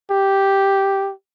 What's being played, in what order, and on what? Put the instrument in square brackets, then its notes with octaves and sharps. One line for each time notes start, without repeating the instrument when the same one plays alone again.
[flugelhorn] G4